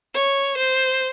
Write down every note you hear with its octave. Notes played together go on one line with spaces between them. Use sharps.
C#5
C5